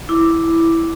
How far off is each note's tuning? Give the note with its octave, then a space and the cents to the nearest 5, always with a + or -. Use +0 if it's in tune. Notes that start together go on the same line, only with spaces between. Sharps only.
E4 +0 D6 +0